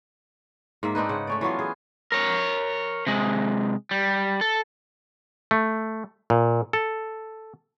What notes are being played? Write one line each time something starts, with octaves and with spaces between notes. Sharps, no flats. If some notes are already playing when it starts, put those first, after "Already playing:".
G#2 A#3 E5
C4 D4 D#4 B4
C#3 F#5
A3 C#4 D5
E3 F#3 B3 F4
G#4
A#4 C#5
C3 G#3
G3
A4
A3
A#2
A4